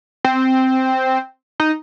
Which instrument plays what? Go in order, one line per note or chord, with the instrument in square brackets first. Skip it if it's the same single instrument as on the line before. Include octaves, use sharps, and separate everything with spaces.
[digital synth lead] C4
D#4